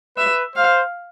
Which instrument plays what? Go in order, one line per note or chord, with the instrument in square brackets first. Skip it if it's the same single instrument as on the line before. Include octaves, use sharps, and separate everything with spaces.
[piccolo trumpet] B4 [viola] E5
[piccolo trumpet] C5 [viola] F5